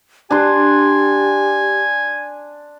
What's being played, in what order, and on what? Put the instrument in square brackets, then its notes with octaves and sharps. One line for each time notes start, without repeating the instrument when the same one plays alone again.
[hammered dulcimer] D4 C6 [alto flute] G4 [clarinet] G#5